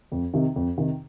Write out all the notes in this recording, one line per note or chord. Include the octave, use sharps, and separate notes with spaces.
F2
C3 D#3
F2
C3 D#3